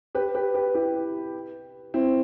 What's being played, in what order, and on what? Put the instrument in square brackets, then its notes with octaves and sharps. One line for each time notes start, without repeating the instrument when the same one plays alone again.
[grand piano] G4 B4
G4 B4
G4 B4
E4 G4
C4 E4